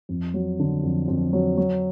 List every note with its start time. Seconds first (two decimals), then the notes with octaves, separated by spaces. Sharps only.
0.09 F2
0.34 F#3
0.59 D3
0.84 F2
1.08 F2
1.33 F#3
1.57 F#3